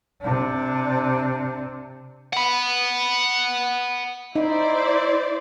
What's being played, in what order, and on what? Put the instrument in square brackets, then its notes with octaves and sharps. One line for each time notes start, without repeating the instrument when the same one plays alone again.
[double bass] C3 D4
[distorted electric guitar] F#5 B5
[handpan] D#4 [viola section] E4 C5 D5